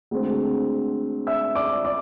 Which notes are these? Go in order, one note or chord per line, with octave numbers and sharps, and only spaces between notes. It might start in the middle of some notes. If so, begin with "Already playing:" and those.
D2 D3 G#3 C4
E5 E6
D5 D6
D5 D6